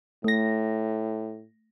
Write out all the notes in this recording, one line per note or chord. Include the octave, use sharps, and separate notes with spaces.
A2 A3 A#6